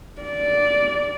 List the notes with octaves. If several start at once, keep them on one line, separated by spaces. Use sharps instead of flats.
D5